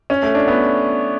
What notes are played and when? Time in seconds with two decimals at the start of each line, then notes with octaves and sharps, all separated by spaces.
0.10 C#4
0.23 A3
0.35 D4
0.48 B3